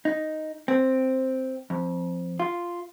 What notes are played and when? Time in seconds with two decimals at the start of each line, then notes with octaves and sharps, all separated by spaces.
0.05 D#4
0.68 C4
1.70 F2
2.40 F4